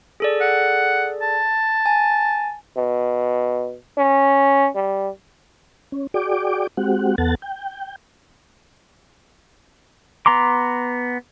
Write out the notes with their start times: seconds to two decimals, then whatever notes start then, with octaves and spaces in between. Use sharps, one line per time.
0.20 G#4 A4 D5
0.41 F#5
1.22 A5
1.86 G#5
2.77 B2
3.98 C#4
4.75 G3
5.92 C#4
6.14 F#4 G#4 D5 G5 D6
6.77 G#3 C4 F#4 G4 F#5
7.18 E2 B3 A4 F#5 A6
7.42 G5
10.26 B3 A#5 C6 D6